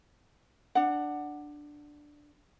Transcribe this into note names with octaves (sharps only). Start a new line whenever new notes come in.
D4 F#5